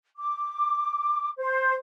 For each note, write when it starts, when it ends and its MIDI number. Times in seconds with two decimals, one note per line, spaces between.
0.16 1.28 86
1.37 1.73 72